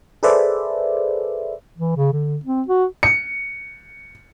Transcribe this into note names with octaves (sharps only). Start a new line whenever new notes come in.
G#4 A4 B4 C5 D5 E5
E3
C#3
D3
C4
F#4
C#7